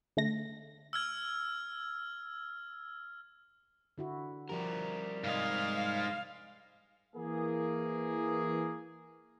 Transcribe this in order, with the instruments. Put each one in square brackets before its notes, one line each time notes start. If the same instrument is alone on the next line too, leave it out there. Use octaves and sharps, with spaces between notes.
[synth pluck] D3 A3 A#6
[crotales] E6 F6 G#6
[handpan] D3 E4 F#4
[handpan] F3 G4 [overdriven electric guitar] G3 A#4
[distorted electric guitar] G#2 G#4 [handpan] C3 D#5 [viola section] F5
[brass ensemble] E3 A#3 G#4